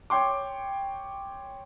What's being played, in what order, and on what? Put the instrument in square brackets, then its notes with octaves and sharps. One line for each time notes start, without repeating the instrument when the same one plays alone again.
[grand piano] C#5 G5 C6 D6